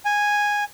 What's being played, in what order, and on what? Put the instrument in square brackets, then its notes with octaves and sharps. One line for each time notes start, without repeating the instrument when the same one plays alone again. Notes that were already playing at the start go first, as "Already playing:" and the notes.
[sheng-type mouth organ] G#5